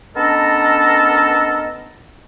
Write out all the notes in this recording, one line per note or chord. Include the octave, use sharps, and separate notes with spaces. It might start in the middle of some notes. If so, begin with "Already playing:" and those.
B3 C#4 D4 A4 A#4 D#5